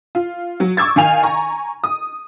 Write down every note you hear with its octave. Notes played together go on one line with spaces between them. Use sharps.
F4
F#3
C#6 D6 E6 G#6 A6
D#3 F5 G#5 F7
G#5 A#5 C#6
D#6